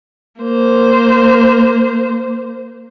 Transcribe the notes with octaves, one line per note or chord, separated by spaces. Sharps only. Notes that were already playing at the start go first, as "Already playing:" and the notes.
A#3 C5